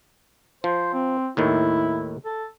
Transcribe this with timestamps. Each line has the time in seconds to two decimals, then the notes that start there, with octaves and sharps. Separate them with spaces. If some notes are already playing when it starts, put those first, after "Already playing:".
0.64 F3 C5
0.93 C4
1.37 D#2 A2 D#3 E4
2.25 A4